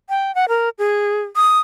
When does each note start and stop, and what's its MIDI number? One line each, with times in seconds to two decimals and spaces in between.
0.09 0.34 79
0.35 0.45 78
0.49 0.69 70
0.78 1.22 68
1.36 1.59 87